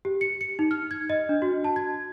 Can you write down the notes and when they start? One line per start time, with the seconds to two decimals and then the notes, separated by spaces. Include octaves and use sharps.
0.05 G4
0.21 C#7
0.41 C#7
0.59 D#4
0.71 F6
0.91 G#6
1.10 D#5
1.29 D4
1.42 F#4
1.64 A5
1.76 G#6